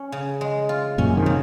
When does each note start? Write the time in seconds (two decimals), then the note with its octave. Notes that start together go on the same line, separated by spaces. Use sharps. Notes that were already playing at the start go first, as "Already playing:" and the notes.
Already playing: C#4
0.12 C#3
0.41 G#3
0.69 F4
0.98 F#2 A#2 C#4
1.17 C3 D#3
1.26 C#3